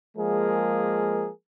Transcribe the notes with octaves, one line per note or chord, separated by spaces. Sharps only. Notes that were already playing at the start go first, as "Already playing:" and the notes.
F3 G#3 A#3 G#4 A#4